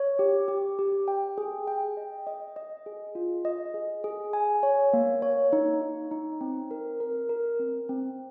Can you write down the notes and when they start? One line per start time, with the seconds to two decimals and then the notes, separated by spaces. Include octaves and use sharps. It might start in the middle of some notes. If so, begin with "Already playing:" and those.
Already playing: C#5
0.19 G4
0.48 G4
0.79 G4
1.08 G5
1.38 G#4
1.67 G5
1.97 D#5
2.27 D#5
2.56 D#5
2.86 G#4
3.15 F4
3.45 D#5
3.74 G#4
4.04 G#4
4.33 G#5
4.63 C#5
4.93 A#3
5.22 C#5
5.53 D#4
5.82 D#4
6.11 D#4
6.41 C4
6.71 A#4
7.00 A#4
7.29 A#4
7.59 C4
7.89 C4